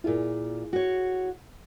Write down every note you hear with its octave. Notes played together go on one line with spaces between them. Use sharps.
A#2 E4 F4 G#4
F#4 C#5